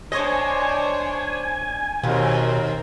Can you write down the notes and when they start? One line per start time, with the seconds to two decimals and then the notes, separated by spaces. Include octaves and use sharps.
0.12 D4 C5 C#5 D#5 G#5
2.03 D#2 B2 C4 A#4